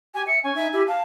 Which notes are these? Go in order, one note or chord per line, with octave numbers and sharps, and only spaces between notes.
G4 G#5
E5 C#7
C#4 G#5
D#4 E5
E4 G4
F5 A5